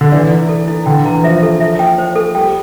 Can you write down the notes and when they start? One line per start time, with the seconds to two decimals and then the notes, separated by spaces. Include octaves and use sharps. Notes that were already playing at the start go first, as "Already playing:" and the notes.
0.01 D3
0.12 E3 D5
0.31 E4
0.49 A4
0.68 E4
0.86 D3 G5
1.05 E3 A#5
1.23 F3 E5
1.43 A4
1.60 E5
1.79 G5
1.98 C5
2.16 A4
2.35 G3 G5